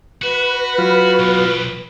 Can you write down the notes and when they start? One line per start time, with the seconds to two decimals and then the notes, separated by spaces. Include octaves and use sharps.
0.22 F#4 B4
0.78 F#3 F4
1.19 B1 B2